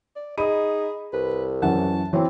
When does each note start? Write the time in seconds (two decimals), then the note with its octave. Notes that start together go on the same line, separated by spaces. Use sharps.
0.16 D5
0.38 D#4 G#4 D#5 B5 D#7
1.13 C2 B4
1.62 F#2 E3 C#4 F#5 A5
2.13 E3 F#3 C4 E5 C6